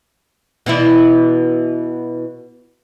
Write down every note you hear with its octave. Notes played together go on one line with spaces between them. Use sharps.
B2 E3 E4